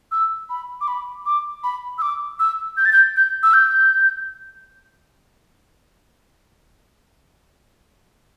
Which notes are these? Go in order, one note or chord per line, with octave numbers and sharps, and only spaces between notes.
E6
B5
D6
B5
D6
B5
E6
D6
E6
G6
A6
G6
G6
E6
G6